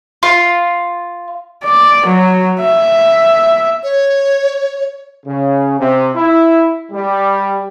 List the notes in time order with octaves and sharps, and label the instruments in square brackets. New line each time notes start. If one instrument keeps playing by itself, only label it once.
[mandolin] F4
[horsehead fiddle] D5
F#3
E5
[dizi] C#5
[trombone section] C#3
C3
E4
G3